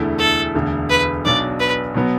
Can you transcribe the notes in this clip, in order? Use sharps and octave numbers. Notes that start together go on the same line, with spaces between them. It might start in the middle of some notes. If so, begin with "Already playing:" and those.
Already playing: E1 D2 D3 A3 E4
A4
E1 D2 D3
B4
B1 B2 F#3 D4 D5
B4
B2 F#3 B3